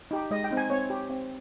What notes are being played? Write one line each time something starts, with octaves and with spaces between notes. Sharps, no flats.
D#4 G4
G#3 D#5
G5
C4 D#4
G#5
C4 C#5
G4
C4